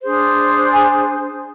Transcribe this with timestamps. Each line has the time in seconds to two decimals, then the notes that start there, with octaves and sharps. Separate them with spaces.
0.01 D4 G#4 C5
0.71 G#5